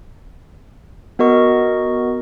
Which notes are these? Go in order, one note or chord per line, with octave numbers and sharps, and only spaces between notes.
B3 F#4 A#4 D#5 C#6